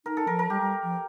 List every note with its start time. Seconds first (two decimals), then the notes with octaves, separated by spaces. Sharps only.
0.05 D#4 A#4
0.17 A4
0.27 F3 A#4
0.39 A#4
0.50 G3 G4
0.61 G3
0.83 F3